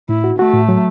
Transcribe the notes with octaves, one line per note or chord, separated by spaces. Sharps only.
A2 E4
F#4
A3 F#4
A2
F#3